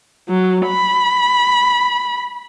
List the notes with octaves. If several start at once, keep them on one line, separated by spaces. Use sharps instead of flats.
F#3
B5